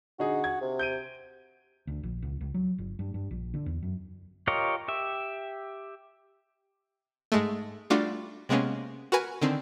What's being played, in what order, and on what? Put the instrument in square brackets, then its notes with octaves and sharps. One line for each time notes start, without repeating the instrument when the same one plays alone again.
[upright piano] D3 D#4 G#4 [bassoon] F#4
[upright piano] G#6
[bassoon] C3
[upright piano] G6 D7 D#7
[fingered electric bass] D2
A#1
C#2
C#2
F#3
G1
G2
G2
A#1
D3
E2
F#2
[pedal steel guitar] F4 G4 A#4 C#5 D#5
G4 E5
[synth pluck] G#2 G#3 A3
G3 A3 D4 F4 F#4
C3 G#3 A#3 B3 C#4
F#4 A#4 B4 G#5
D3 D#3 C4